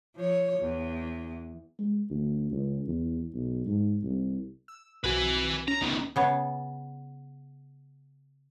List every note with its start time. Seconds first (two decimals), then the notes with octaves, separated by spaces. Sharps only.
0.16 F3 C#5
0.59 E2
1.79 G#3
2.10 D2
2.51 C#2
2.87 E2
3.34 B1
3.66 G#2
4.03 C2
4.68 E6
5.04 B1 C4 F#4 B4 G#5
5.68 C#4 A#5
5.81 C#2 D#3 B3
6.16 C#3 B3 C#5